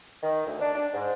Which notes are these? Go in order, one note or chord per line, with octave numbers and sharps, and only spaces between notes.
D#3
D2
D4
D4
G#2